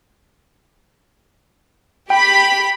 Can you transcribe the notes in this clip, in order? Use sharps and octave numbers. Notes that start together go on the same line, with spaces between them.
G4 G5 B5